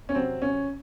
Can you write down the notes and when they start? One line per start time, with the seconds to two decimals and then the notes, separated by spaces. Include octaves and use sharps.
0.09 C#4
0.15 C3 F#3 C4
0.42 C#4